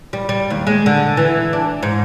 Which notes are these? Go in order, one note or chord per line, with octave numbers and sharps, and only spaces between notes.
G3
G3
D#2
G#3
D3
E3
D4
G#2